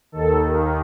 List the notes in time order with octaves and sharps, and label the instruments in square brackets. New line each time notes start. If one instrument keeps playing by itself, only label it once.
[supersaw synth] D#2 D#3 A4